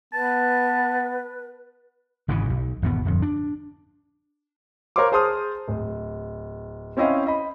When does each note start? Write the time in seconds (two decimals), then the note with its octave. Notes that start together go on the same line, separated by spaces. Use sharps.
0.13 B3 B4 A5
2.28 G#1 G#2 C#3 E3
2.50 B1
2.82 G#1 E2 B2 B3
3.05 D1 G1 F2
3.22 D4
4.96 A#4 C5 C#5 F5 C6 D6
5.12 G#4 C5 A5 C6 D#6 F6
5.68 D1
6.97 C4 C#4 E4 D#5 F5 G5
7.27 D#5 B5